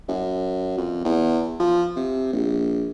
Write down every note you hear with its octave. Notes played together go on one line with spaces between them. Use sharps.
F#2
F2
E2
F3
C3
A#1